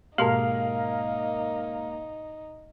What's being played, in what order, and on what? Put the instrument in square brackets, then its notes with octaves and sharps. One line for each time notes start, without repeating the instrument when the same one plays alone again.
[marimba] G#2 B2 G4 [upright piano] G#3 A#3 A#4 [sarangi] D#4 [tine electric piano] F5